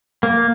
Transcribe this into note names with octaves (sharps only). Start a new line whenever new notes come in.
A#3